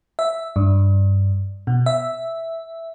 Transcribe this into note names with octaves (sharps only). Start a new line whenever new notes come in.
E5
G2
B2
E5